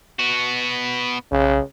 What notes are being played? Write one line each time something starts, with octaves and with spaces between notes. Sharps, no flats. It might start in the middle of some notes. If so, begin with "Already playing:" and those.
B3 F#4
B1 C#3